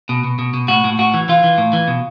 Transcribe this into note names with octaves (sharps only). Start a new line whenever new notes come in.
B2
B2
B2
B2
A2 F#4
A2
A2 F#4
E3
E3 F4
E3
A2
E3
B2